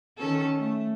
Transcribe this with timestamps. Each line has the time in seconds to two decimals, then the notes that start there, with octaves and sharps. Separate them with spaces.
0.18 D#3 C#4 A4
0.59 A3